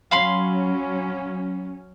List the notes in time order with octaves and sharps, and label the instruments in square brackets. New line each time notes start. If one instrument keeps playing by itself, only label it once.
[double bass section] F#3 C#4 [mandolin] F5 B5 C6